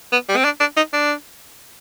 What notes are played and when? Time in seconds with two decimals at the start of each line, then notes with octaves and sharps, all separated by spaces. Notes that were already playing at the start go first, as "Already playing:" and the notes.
0.12 B3
0.29 G3
0.37 C4
0.45 D4
0.60 D4
0.77 D#4
0.93 D4